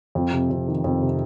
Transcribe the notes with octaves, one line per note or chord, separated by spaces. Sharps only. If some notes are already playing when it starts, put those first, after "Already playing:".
F2
C3
F2
D#3
F2
C3